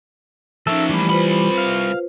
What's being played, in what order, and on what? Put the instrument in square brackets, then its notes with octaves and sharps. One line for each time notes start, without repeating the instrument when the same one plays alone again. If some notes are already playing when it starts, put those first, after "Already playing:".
[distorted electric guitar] F3 A#4 [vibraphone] C#4 D#4 E5 [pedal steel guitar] A4
[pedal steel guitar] E3 G3 [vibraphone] A3 B5
[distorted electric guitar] C2 B5 [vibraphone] F4 B4 C5
[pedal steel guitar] F5